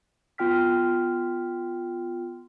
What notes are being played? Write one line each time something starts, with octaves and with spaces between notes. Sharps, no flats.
B3 F4 G5 F6 B6